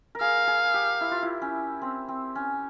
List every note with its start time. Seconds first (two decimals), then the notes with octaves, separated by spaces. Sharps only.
0.15 A#4
0.20 G#4 F5
0.47 G#4
0.74 G4
1.01 E4
1.11 F4
1.23 E4
1.42 C#4
1.82 C4
2.08 C4
2.35 C#4